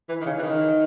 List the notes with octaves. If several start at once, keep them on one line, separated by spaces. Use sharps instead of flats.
E3
D#3
C#3
E3
D#3